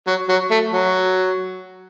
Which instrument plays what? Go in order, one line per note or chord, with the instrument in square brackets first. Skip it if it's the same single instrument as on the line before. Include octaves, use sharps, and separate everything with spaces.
[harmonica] F#3
F#3
A3
F#3